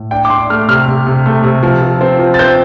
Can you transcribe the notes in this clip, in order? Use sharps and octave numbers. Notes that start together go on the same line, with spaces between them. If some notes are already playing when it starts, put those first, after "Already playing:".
Already playing: A2
D4 G5
D6
D4 C6
A3 F6
C3 F6
C3
C3
A3
C3
F3
F3
C4
F3
A6
C4 G6